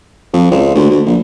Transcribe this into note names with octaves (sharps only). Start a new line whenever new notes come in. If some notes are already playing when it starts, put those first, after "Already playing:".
F2
C#2
D2
D2
A#1